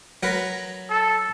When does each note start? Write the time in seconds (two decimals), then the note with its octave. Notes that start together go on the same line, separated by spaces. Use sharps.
0.23 F#3 A#4 B4
0.90 A4